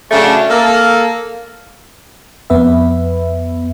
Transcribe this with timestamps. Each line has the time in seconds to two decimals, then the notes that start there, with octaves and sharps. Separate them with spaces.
0.11 C#3 F#3 A3 C#4 D4
0.50 A#3 A4
2.50 F2 B3 B4 E5